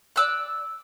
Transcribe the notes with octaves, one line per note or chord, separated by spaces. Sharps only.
D5 E6 F#6